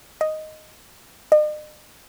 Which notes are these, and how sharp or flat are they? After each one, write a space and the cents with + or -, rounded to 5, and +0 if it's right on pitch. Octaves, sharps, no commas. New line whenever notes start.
D#5 +0
D#5 -45